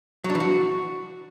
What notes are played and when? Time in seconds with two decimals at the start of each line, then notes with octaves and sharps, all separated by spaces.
0.24 F#3
0.30 D4
0.35 E3
0.40 F#4